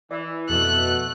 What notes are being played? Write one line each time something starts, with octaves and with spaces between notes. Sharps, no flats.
E3 D5 E5
F2 B2 A3 A4 F#6